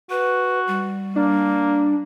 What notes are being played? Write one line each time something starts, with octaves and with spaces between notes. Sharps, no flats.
F#4 B4
G3
A#3 D4